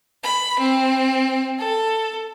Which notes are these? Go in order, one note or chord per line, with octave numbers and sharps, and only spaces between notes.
B5
C4
A4